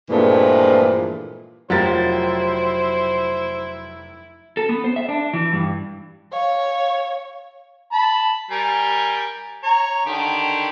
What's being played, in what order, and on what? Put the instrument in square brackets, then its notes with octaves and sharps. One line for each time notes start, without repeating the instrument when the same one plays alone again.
[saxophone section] G2 A#2 E3 F3 G#3 A3
[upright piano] F1 G4 A6 [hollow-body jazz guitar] F#3 F4 A#4 [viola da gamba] E4 [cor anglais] C5
[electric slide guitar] A4
B3
C5
E5
D4
E3
G2
[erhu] C#5 [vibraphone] F5
[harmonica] A5 B5
G3 A#4 G#5
C#5 A#5
D3 D#3 G4